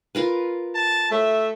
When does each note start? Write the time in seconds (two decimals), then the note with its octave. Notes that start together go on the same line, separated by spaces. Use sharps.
0.15 F4 A#4 B4
0.75 A5
1.11 A3 E5